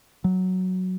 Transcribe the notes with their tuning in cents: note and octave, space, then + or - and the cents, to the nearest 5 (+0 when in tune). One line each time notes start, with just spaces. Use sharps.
F#3 +0